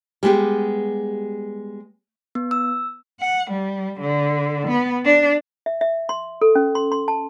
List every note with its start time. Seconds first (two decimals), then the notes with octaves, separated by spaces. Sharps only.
0.23 G3 G#3 B3 G4
2.35 B3
2.51 E6
3.20 F#5
3.51 G3
4.00 D3
4.68 B3
5.05 D4
5.66 E5
5.81 E5
6.09 C6
6.42 A4
6.55 C#4
6.75 C6
6.92 C6
7.08 A5